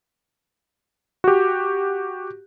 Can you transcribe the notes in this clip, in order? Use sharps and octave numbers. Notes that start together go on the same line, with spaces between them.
F#4 G4